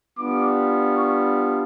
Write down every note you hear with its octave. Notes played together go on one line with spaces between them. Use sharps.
G3 B3 D4 F4 D6
C#6